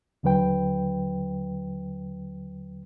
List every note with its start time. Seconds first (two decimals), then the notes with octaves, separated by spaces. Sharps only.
0.23 D#2 D3 F#3 B4 G5